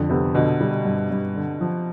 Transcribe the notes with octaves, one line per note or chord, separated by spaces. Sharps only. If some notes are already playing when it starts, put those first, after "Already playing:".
Already playing: F2 D3
C3 B3
B2 D3
G3
G2
G2
D3
F3